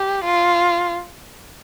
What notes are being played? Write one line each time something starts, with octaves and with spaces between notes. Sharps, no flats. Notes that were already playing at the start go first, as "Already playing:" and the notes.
Already playing: G4
F4